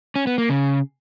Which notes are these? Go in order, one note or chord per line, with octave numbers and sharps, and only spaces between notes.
C#4
B3
A#3
C#3